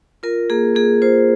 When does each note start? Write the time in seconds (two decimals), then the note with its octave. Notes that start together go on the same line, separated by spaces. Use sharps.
0.23 F4 A#4
0.50 A#3 G#4
0.75 A#3 G#4
1.02 F4 C5